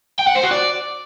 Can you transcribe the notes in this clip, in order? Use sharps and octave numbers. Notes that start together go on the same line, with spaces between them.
G5
F#5
C5
F#4
D5